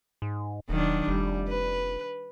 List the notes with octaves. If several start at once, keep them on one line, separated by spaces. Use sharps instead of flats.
G#2
D#1 D#3 F#3 D4
F1 G3
B4